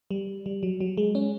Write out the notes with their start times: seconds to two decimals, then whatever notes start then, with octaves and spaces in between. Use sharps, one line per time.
0.11 G3
0.46 G3
0.63 F#3
0.80 F#3
0.97 G#3
1.15 C#4